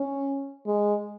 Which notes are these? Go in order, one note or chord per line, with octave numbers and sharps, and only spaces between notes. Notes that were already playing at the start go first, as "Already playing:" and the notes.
Already playing: C#4
G#3